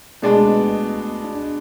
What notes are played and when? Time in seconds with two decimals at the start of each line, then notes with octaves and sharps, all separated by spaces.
0.22 B2 G#3 A3 D4
0.48 B3
1.24 D4